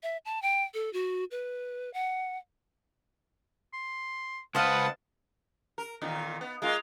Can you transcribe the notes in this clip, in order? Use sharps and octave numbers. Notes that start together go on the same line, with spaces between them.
E5
A5
G5
A4
F#4
B4
F#5
C6
C#2 B4 C5 D#5 F5 F#5 A5
A#4
E2 A#2 D#3
B3
G#3 A#3 F4